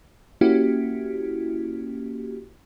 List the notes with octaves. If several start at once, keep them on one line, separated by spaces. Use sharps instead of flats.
A#3 C#4 E4 F#4 G4